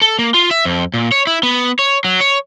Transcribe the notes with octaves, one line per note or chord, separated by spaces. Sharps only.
A4
A#3
F4
E5
F2
A#2
C#5
E4
B3
C#5
F#3
C#5